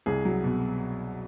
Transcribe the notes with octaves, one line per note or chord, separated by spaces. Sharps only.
C2 G#4
F#3
B2